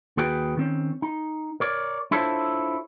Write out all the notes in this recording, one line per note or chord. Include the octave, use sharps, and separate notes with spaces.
D#2 F#4 G#4 B4 G5
D#3 C4 C#4
D#4
A#4 C#5 D5
D4 E4 F4 A4 C5 C#5